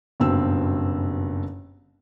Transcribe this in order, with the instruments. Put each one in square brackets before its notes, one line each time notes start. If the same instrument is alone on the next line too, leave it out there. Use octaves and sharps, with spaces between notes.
[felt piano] F#1 G2 B2 C4 E6